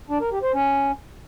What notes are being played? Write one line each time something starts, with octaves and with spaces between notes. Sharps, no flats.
D4
A#4
G4
C5
C#4